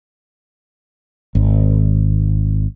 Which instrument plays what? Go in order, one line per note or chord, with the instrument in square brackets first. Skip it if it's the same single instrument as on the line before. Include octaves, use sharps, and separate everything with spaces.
[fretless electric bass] G#1